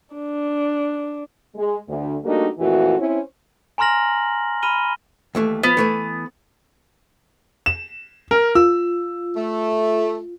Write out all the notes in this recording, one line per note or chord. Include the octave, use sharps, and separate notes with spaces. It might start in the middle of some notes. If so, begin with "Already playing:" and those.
D4
G#3
D2
G3 A3 A#3 D4 D#4 F#4
F2 A#2 E3 A3 F#4
C4 C#4 E4 C5
G#5 A#5 C6 F6 A#6 F#7
B5 F6 D#7 G7
D#2 E3 A3
F3 B3
E3 A3 B4
E7
A#4 F6
F4 E6
A3